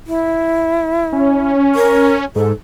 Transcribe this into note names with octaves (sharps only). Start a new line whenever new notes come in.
E4
C#4
A#4
G#2 A4